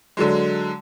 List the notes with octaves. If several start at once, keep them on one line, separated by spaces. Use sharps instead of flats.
D3 F#3 G#3